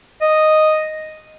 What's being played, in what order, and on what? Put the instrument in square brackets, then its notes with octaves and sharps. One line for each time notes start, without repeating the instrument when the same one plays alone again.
[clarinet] D#5